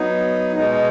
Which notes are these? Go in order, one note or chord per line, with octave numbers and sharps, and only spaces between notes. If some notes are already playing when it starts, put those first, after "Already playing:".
Already playing: F#3 B3 D#4
B2 G#3 B3 D#4